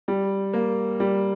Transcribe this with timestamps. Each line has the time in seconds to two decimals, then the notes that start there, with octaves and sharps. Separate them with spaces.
0.08 G3
0.53 A#3
1.00 G3